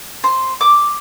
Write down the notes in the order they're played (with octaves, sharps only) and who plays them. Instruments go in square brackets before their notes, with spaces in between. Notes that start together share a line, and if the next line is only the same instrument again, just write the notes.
[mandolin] C5
D6